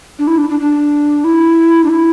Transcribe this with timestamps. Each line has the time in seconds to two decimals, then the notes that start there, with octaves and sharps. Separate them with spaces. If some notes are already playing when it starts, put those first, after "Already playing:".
0.19 D4
0.27 E4
0.38 D4
0.49 D4
0.60 D4
1.24 E4
1.84 D4
1.89 E4